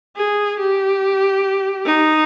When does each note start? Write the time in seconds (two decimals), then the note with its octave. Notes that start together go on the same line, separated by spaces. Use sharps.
0.16 G#4
0.59 G4
1.86 D#4